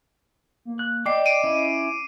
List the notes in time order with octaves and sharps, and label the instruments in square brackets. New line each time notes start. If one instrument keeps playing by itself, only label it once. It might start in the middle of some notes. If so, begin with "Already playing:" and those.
[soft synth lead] A#3
[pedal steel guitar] F#6
[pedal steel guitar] D5 G5 [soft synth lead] D#5 [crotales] D6 C7
[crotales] D7 D#7
[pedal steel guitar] C#4 E4